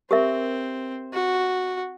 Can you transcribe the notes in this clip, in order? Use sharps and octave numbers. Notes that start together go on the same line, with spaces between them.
C4 G4 A#4 E5
F#4